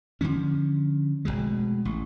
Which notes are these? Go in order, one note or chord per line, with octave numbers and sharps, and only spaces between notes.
D3 D#3 F3 C#4
F1 D#2 B2 G#3
A1